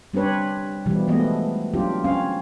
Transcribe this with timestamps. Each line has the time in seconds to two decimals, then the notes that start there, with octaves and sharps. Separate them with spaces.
0.14 G3 C4 D4 B4 C#5
0.86 B2 E3 F3 G3
1.08 E3 F3 G#3 A3 B3 D#5
1.74 F#3 C4 D4 F4 G4
2.04 C4 C#4 F5